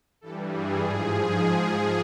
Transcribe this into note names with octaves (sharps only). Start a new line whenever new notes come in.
G2 E3 G3 A4
G#4
G#2 F3 G#4